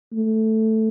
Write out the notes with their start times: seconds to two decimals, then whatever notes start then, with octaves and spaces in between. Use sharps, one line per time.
0.13 A3